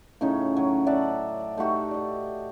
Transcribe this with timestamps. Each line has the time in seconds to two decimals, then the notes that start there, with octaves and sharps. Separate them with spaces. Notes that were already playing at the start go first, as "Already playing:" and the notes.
0.21 A2 C#3 C#4 D#4
0.57 F#3
0.87 D5 E5 F#5 A5
1.58 A3 D#4 F#4 G4
1.91 D5 D#5